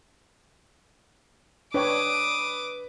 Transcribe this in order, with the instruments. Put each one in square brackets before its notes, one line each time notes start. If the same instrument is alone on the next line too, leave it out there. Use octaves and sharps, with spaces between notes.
[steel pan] D4 C#5 G5 [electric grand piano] B4 [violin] D6 D#6